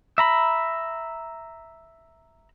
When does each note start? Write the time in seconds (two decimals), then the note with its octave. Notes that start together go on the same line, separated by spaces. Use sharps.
0.18 E5 A#5 B5